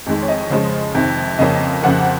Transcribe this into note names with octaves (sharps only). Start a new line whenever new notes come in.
F2 D#3 G#3
C#5
D#5
C#3 F3 G#3 C#4
F2 C3 D#3
F2 C#3 F3 A#3 C#4 D#5
F2 C#3 F3 A#3 F#5